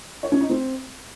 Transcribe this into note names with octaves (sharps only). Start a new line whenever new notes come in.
C#5
C#4
D#4
C4